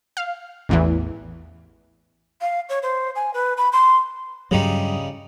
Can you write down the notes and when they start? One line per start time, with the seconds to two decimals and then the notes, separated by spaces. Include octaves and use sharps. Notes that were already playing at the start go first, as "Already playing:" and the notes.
0.17 F5
0.69 A1 E2 E3
2.41 F5
2.69 C#5
2.83 C5
3.16 G#5
3.34 B4
3.57 B5
3.73 C6
4.51 G2 C#3 F#3 G3 D#4